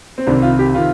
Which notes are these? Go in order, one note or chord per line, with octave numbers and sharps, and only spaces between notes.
C4
C2 C3 D#3 D4
F4
G4
C3 D#3 F4